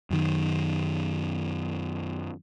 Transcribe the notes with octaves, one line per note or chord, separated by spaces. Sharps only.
F#2 D#3